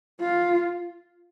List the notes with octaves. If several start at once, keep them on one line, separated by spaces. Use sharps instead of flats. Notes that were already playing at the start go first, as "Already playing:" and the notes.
F4